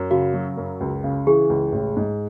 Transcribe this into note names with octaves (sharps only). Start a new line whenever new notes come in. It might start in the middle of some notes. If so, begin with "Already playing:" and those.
Already playing: F#2
C#3 F#4
F#3
F#2
C#2
C#3
E3 G#4
C#2
A1
G#2